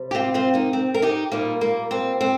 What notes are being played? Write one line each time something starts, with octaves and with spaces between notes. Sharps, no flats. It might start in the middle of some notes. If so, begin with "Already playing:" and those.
Already playing: C3 G3
G4
C4 F4
C4 F4
A#3 D#4
C4
A#4
D#4 G4
A#2 G3 A#3 D#4
A#3
C4
C4